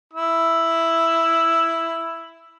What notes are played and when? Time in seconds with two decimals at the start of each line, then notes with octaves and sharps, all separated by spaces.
0.13 E4 E6